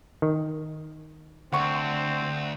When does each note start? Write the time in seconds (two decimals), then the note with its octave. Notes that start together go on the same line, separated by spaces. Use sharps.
0.22 D#3
1.52 D2 C4 F#5 C#6